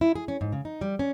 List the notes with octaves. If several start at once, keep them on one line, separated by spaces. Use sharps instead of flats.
E4
G#4
C#4
G#2
C#3
D#4
G3
C#4